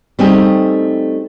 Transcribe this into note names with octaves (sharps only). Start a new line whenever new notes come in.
G3 A3 C4 D#4 G4 G#4